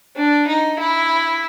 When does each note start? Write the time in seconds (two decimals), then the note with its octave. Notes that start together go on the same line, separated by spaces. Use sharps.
0.16 D4
0.47 D#4
0.79 E4